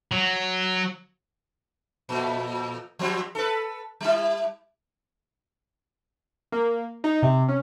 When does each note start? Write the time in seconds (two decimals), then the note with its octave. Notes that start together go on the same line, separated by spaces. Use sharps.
0.12 F#3
2.09 F2 A#2
2.99 F3 G3 C4
3.35 A4 B4
4.01 G3 E4
6.52 A#3
7.04 D#4
7.22 C3
7.48 C#4